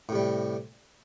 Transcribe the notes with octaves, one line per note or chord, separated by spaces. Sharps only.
A2 C3 G3